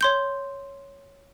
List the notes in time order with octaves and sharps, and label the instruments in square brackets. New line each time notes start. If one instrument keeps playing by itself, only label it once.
[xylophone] C#5 C6 G6